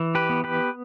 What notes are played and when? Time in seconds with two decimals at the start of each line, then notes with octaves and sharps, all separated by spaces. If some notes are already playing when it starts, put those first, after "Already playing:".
Already playing: E3
0.15 G4 B4
0.29 B3
0.44 G4 B4